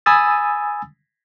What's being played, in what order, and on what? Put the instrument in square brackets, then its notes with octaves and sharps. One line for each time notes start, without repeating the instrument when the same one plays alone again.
[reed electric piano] G#5 B5 D#6 E6 A6